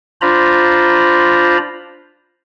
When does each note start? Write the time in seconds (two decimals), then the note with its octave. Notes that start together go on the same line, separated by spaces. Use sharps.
0.21 D4 F4 C5 A#5 B5